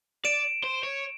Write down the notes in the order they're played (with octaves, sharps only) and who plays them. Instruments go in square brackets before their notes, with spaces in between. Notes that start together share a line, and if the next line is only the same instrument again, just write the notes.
[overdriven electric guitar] D5 [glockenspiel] D7 E7
[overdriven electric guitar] C5
C#5